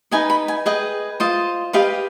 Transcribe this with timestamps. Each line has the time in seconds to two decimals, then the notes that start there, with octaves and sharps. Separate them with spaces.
0.11 D#4 B4 D#5 G#5
0.30 B5
0.48 G#5
0.66 G#4 B4 D#5 G5
1.20 F4 C5 D#5
1.73 G4 B4 D#5 F5